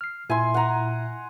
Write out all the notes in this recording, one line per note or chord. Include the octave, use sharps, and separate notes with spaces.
F6 C7
A#2 E4 E5 G#5 C6
F#5 A#5